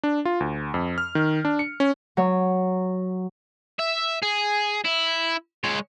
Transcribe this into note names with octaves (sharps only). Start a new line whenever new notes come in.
D4
F4
D2
F2
F6
D#3
D4
C#7
C#4
F#3 C#5
E5
G#4
E4
G#3 C#5